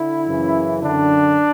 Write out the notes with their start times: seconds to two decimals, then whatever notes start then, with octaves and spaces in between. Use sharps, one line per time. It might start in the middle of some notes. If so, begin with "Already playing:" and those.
Already playing: D3 E4
0.26 F#2 C#3 E3
0.83 F#2 D3 D4